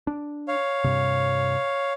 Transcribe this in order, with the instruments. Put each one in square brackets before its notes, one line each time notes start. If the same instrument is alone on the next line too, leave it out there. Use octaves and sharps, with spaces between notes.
[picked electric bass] D4
[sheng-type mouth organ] C#5 F5
[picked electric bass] G2 C3